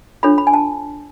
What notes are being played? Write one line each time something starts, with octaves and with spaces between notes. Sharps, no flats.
D4 F4 A4 C#5 B5
B5
G#5
A5